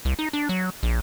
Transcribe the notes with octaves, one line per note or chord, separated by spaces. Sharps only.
C2
D#4
D4
F#3
A#1